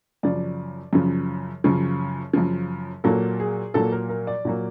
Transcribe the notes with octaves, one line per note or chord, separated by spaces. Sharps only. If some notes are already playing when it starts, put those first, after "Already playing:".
F#2 C#3 F3 D5
F#2 C#3 F3
F#2 C#3 F3
F#2 C#3 F3
A#2 F#3 A#3 A4
G#4
A#2 F#3 A#3 A4
A#4
A#4
D5
A#2 F#3 A#3